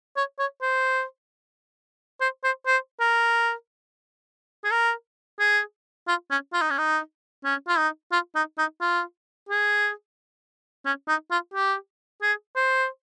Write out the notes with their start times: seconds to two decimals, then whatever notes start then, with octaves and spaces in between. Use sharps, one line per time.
0.16 C#5
0.39 C#5
0.61 C5
2.21 C5
2.44 C5
2.67 C5
3.00 A#4
4.64 G#4
4.71 A#4
5.40 G#4
6.08 F4
6.30 C#4
6.53 F4
6.62 D#4
6.70 C#4
6.78 D#4
7.44 C#4
7.68 F4
7.78 D#4
8.12 F4
8.35 D#4
8.58 D#4
8.81 F4
9.49 G#4
10.85 C#4
11.08 D#4
11.31 F4
11.54 G4
12.22 G#4
12.56 C5